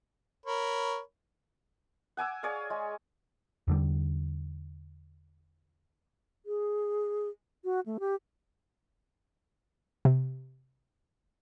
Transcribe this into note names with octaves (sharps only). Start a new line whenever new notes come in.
A#4 C#5 B5
F#5 G#5 D6 E6
G#4 C#5 D5 F5
G#3
E2 D3 G3
G#4
F#4
A3
G4
C3